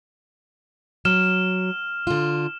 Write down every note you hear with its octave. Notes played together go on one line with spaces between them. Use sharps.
F#3 F6 E7
D3 F4